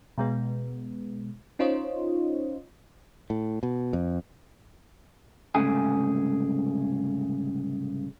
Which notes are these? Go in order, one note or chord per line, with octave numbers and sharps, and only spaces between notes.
B2 G#3 B3
C#4 D#4 F4 C5 C#5 D#5
A2
B2
F2
C2 G#2 C#3 A3 G#4 G#5